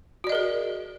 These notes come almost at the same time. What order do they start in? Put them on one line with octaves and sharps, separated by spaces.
F#4 D5 D#5 A#4 G#4